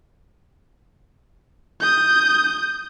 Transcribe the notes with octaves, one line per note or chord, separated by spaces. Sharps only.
D#6 G6